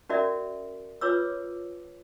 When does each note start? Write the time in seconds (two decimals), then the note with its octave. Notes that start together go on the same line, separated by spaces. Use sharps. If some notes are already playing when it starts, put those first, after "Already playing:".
0.09 C#4 F#4 A#4 D5 E5
1.01 F4 B4 C#5 D6 E6